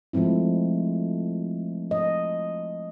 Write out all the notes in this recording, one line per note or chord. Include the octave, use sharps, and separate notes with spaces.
F3 G#3 A3 C4 E4
D#5